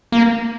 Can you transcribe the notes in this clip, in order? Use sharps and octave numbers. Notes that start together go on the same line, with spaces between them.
A#3